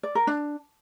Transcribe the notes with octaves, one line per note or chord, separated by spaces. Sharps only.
D5
A#4
D4